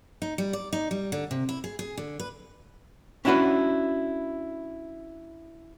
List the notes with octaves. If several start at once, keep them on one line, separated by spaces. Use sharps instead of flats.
D#4
G3
D5
D#4
G3
D3
C3
E4
G#4
G#4
D3
B4
C#4 D4 E4 F#4 B4